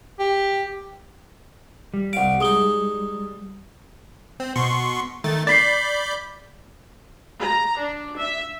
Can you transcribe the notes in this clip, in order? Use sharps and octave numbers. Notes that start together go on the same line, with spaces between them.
G4
G3
C2 F5 F#5 D7
G#3 D#4 G#4 D#6 G7
C4
B2 C6 C#6
D#3 A3 A6
D5 B5 G6 A6 B6 C7
A#5
D4
E5